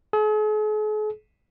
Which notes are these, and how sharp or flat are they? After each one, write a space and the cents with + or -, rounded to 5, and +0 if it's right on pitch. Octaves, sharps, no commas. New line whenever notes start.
G#4 +45